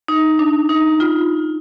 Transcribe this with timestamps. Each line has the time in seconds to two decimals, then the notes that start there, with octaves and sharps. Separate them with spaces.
0.08 D#4
0.39 D4
0.69 D#4
1.00 F4